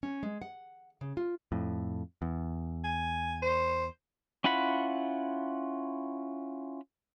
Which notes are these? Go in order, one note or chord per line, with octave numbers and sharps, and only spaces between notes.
C#4
G#3
F#5
C#3
F4
F2 A2
E2
G#5
C5
C#4 E4 F4 F#5 B5